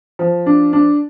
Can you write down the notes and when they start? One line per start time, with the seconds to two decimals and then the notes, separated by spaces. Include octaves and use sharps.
0.19 F3
0.46 D4
0.73 D4